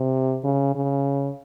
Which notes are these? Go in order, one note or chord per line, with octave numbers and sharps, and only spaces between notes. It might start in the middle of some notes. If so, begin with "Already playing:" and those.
Already playing: C3
C#3
C#3